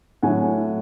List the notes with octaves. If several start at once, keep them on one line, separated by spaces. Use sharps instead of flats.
A2 F#3 F#5 G#5